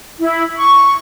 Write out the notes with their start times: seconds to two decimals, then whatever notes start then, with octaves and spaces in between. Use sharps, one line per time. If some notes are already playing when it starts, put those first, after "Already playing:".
0.19 E4
0.57 C#6